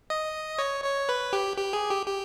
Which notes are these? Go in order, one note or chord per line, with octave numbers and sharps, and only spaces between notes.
D#5
C#5
C#5
B4
G4
G4
G#4
G4
G4